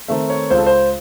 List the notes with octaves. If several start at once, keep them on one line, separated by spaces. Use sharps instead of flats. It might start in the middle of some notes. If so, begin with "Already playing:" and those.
D#3 A3 C4 E5
C#5
C#2 C5
A4
C5